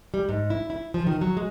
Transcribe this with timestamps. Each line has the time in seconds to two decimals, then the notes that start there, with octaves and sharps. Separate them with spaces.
0.14 G3
0.29 G#2
0.50 E4
0.70 E4
0.94 F3
1.07 D#3
1.21 F#3
1.37 G#3